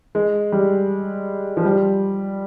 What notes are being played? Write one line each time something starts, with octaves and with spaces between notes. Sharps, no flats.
G#3
G3
F3
G3